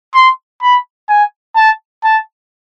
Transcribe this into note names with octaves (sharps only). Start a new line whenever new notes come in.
C6
B5
G#5
A5
A5